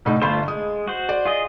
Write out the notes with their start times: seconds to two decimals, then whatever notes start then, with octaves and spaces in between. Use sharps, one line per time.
0.05 C2 A2 D#4
0.22 G1 A3 F4 C5 B5
0.48 G#3 D#6
0.87 F#4 C5
1.09 D5
1.25 F4 G#4 D#5